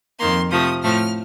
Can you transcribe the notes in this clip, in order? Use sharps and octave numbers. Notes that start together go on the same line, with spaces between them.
F2 D#3 A#3 C6
C3 F3 A3 D#6
A2 F3 A3 F6